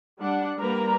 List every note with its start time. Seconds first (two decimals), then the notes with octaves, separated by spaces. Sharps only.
0.19 G3 D4 F#5
0.59 G3 A#3 A#4 B4 A#5